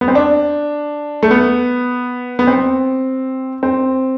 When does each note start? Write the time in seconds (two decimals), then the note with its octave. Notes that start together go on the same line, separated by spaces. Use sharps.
0.01 B3
0.08 C4
0.15 D4
1.23 A3
1.31 B3
2.39 B3
2.47 C4
3.63 C4